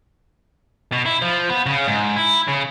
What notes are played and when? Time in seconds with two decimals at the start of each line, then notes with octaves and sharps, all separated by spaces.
0.92 B2
1.06 E4
1.22 F3
1.49 B3
1.66 C#3
1.88 G#2
2.16 E4
2.48 C#3